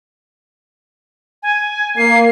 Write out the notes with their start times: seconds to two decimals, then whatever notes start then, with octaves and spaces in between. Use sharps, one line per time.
1.43 G#5
1.97 A#3 C7